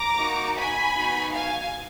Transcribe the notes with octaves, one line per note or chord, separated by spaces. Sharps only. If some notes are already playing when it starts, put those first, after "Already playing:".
Already playing: A#5 D6
A#3 D#4 F#4
G#5 B5
B3 D#4 F#4
F5 G#5